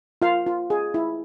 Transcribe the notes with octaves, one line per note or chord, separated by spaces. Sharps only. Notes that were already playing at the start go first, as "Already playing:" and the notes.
F4 F5
F4
G#4
E4